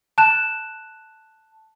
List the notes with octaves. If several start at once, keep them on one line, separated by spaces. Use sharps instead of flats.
A5 F#6 E7